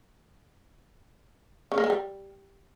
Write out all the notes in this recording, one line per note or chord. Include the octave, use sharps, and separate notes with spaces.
C#3
A#3
G#3
G3